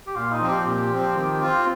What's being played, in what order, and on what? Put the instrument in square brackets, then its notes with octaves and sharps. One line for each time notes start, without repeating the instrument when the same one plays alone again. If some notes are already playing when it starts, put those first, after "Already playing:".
[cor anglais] G4
[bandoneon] A#2 [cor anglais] F4
[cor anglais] D#4
[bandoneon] F3 C4
[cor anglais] G4
[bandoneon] A#2 [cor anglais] G4
[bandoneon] F3 C4
D#3
C4 F4